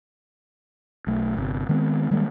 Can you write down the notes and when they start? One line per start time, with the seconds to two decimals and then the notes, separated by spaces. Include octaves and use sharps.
1.07 B1 A3
1.37 G1 C3
1.69 D#3 G#3 B3 C4
2.11 D#3 G3 G#3 A#3